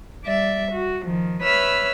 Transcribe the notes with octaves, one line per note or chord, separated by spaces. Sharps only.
G3 D5 E5
F#4
D#3 F3
B4 C#5 E5 B5 E6 F6